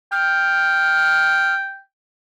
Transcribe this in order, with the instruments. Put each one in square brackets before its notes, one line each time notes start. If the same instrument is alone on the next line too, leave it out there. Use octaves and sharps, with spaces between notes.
[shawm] G5 [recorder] F6